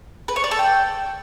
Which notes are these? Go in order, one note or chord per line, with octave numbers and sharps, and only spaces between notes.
B4
C#5
D5
A4
G5